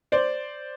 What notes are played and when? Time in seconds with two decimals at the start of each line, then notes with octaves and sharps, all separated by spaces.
0.12 C5 D5